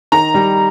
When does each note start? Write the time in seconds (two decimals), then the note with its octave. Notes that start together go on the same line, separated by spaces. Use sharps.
0.12 D#3 A#5
0.34 G3